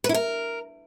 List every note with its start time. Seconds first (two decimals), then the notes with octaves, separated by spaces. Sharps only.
0.04 B4
0.09 E4
0.14 A#4